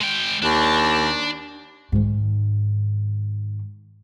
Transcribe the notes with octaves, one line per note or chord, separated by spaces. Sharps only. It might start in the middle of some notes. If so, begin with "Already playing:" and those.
G#3 G5
D#2 D4
G#2 D#3